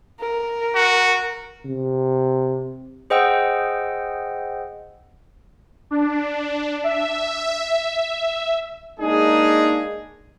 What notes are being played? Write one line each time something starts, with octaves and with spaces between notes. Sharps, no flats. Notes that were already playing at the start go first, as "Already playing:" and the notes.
A#4
F#4
C3
G#4 C5 D#5 F#5 G5 E6
D4
E5
G#3 A#3 D4 D#4 G#4